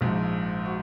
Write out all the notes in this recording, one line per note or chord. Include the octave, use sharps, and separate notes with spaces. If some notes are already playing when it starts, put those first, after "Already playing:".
A#1 G#2 F3
F#4